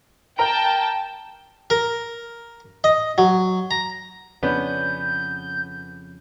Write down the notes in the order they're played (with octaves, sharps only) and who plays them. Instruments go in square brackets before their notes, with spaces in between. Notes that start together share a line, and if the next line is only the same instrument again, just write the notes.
[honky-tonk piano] A#4 A#5 D7 [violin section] G5 A5
[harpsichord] A#4
D#5
F#3
A#5
[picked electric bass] F2 C#3 [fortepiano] B3 C#4 D4 [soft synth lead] G6